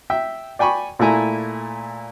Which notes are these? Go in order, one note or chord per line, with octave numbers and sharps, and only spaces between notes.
E5 G5
D5 G5 G#5 B5 C#6
A#2 A3 E4 G#5 A#5